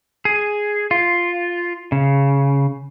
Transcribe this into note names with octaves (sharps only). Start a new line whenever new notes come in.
G#4
F4
C#3